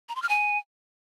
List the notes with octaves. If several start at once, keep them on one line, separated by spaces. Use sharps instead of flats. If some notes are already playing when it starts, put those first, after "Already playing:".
A#5
C6
F6
G#5